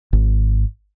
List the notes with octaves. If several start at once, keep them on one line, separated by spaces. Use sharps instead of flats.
G#1